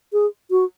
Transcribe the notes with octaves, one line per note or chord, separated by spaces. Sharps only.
G#4
F#4